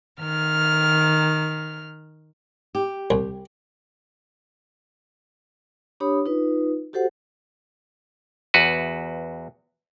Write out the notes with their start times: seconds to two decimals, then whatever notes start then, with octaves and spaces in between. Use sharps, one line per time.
0.19 D#3 F6
2.75 G4
3.11 C2
6.00 D4 G4 C#5 B5 D#6
6.26 D#4 F4 B4
6.93 F#4 G4 A4 C5 F#5
8.54 E2 F#4 B4